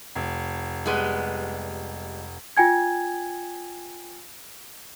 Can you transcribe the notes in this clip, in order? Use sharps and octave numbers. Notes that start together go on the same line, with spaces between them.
F1
G3 G#3 B3
F4 G5 G#5 G#6